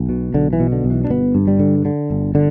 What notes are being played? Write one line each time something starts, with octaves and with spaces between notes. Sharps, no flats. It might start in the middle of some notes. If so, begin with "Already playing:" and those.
Already playing: B1
B2
B1 D3
E3
B2
D3
B1
E3
D4
G1 B3
G2
G3
D3
D3
G1
D3